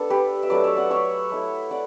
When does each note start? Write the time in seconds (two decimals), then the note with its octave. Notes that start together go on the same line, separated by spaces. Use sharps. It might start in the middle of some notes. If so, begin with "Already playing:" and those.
Already playing: B3 D4 A4
0.10 G4 B4
0.43 E5
0.50 F#3 A3 D4 B4 D5
0.64 C#5 E5
0.77 D5 F#5
0.90 C#5 E5
1.31 A3 E4
1.71 D5 F#5